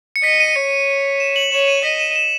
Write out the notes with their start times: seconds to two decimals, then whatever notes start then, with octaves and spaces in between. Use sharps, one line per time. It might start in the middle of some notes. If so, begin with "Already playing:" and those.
0.16 C#7
0.24 D#5 B6
0.40 D#7
0.56 C#5
1.20 E7
1.36 F#7
1.52 C#5 E7
1.68 D#7
1.84 D#5 B6
2.00 E7
2.16 E7